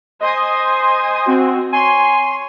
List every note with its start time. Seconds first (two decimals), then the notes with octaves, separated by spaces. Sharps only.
0.20 C5 D#5 G#5 C6 D#6
1.26 C4 F#4
1.73 C#5 G#5 C6